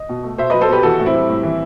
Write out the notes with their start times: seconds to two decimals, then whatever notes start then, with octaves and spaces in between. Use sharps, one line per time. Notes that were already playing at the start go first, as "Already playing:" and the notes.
Already playing: D#5
0.09 B2
0.23 A3
0.38 B2 C5 E5
0.50 F#3 B4 D#5
0.61 A4 C5
0.69 B2 G4 B4
0.83 E3 F#4 A4
0.99 A2
1.06 C4 E4
1.14 G3
1.29 A2
1.43 E3